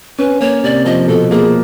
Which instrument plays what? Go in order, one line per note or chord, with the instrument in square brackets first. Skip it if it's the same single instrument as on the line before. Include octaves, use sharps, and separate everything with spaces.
[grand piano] C#4 [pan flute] B4
[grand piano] A#3 [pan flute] C#5
[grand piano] C3 [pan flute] D5
[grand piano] F3 [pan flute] D#5
[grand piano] B2 [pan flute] A4
[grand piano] A#3 [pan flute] G#4